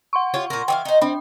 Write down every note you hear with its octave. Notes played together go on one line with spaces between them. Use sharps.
F#5 C6 C#6
F4 G4 C#5
A#2 A#4
E3 E5 F5 G5
D#4 C5
C4 D4 B5